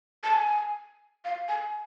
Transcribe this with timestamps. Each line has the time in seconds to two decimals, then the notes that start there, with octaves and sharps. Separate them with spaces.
0.24 A5
0.33 G#5
1.25 F5
1.48 G#5